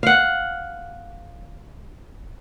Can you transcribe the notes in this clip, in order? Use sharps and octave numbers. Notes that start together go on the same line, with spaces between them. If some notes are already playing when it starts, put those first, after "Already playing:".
F5 F#5